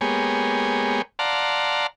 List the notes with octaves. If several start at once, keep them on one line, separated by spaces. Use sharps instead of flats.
G#3 A#3 B3 G4 G#4 C#5
D5 F5 F#5 A5 A#5 C6